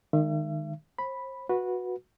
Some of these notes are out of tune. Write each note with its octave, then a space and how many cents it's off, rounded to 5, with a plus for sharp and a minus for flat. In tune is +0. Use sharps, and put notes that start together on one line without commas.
D#3 -25 G#3 +0 E5 +40
C5 +35 B5 -5
F#4 -15 B4 -10